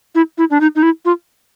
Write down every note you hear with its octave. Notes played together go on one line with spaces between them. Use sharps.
E4
E4
D4
D#4
D#4
E4
F4